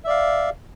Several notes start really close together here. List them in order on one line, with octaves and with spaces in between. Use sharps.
E5 D5 F5